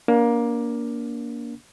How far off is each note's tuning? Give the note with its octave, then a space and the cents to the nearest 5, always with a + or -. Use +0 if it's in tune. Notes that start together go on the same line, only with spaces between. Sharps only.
A#3 +15 D4 -30